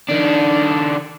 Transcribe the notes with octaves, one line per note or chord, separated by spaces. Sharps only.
D#3 D4